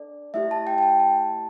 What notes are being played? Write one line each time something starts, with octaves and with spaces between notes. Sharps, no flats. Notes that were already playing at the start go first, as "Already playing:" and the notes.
Already playing: D4 A4 D5
A3 E4 G4 E5
A5
G5
G5
A5
A5